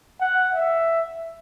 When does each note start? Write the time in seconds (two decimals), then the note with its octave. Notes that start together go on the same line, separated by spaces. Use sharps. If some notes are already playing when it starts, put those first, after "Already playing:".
0.20 F#5
0.54 E5